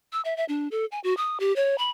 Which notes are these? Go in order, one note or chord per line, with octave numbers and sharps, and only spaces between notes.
E6
E5
E5
D4
A4
G#5
F#4
D#6
G4
C#5
B5